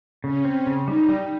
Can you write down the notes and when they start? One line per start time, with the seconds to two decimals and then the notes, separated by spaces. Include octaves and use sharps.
0.23 C#3 C#4
0.45 C4
0.67 C#3
0.87 G3 D#4
1.09 G3